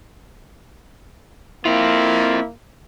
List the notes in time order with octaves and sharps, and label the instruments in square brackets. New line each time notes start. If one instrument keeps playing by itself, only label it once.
[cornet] A#3 [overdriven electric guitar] C4 F4 [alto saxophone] E4